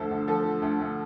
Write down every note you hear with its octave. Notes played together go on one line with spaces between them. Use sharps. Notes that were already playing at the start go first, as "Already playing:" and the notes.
Already playing: D2 D3 F3 A4 C5
D2
F3 A4
D3
D2
D2